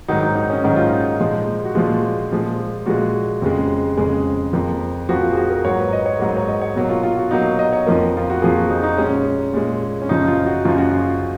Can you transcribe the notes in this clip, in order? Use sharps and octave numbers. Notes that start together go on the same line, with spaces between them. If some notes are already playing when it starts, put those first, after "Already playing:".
G#2 D#3 F#3 D#4
D#4
D#4
C#4
G#2 D#3 F#3 D#4
F4
D#4
A#2 F3 G#3
F#4
A#2 F3 G#3 F4
A#2 F3 G#3
A#2 F3 G#3 F#4
F2 C#3 G#3
F2 C#3 G#3 G#4
F2 F3 A#3
F2 F3 A#3 F#4
F4
G#4
F#4
A#4
G#2 F#3 A#3 C#5
B4
D#5
C#5
G#2 F#3 A#3
C#5
D#5
C#5
B2 F#3 A#3
F4
F4
F#4
B2 F#3 A#3 D#4
D#5
C#5
F2 F3 A#3 A#4
F4
F#4
F2 F3 A#3 G#4
F#4
D#4
D#4
A#2 G#3 C#4
A#2 G#3
C#4
F#2 C#3 F3 D#4
F4
F#4
F#2 C#3 F3 F4
F#4
F4